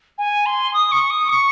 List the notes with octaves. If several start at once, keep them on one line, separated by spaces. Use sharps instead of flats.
G#5
C6
D#6
C#6
D#6
C#6